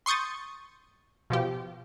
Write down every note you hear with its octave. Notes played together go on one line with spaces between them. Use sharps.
C6 C#6 D#6 G6 A6
B2 F3 G4